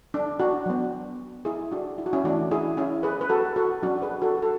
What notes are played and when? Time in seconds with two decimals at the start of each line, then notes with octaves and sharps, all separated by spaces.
0.14 D4
0.40 D4 F#4
0.66 F#3 B3
1.45 E4 G#4
1.71 D4 F#4
1.98 E4
2.06 F#4
2.13 C#4 E4
2.24 E3 A3 C#4 D4 F#4
2.51 E4 G#4
2.77 C#4 E4
3.03 G#4 B4
3.21 B4
3.29 F#4 A4
3.56 F#4 A4
3.82 F#3 C#4 D4 F#4
4.02 G#4 B4
4.22 F#4 A4
4.42 F#4 A4